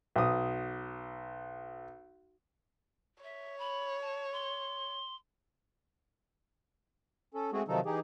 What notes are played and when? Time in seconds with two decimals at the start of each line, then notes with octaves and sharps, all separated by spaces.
0.16 B1 D#6
3.23 C#5 E5
3.59 B5
4.01 A5
4.32 C6
7.34 C#4 A4
7.53 G#3 A3 C4 F#4 G#4
7.68 C3 D#3 F3 F#3 D#4 A4
7.86 E3 D#4 G4 G#4